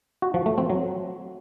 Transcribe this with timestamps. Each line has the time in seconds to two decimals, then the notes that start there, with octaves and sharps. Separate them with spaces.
0.22 F#4
0.34 F3
0.46 A3
0.58 C4
0.70 F#3